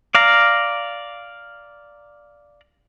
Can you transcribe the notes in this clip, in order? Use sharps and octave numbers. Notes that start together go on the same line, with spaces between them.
D5 F5 A#5